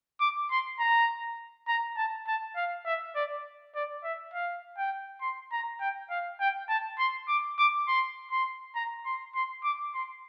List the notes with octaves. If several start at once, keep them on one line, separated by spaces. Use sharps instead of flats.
D6
C6
A#5
A#5
A5
A5
F5
E5
D5
D5
E5
F5
G5
C6
A#5
G5
F5
G5
A5
C6
D6
D6
C6
C6
A#5
C6
C6
D6
C6